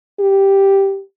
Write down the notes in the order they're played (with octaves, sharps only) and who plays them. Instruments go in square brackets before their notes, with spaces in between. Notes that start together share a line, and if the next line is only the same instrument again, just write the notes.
[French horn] G4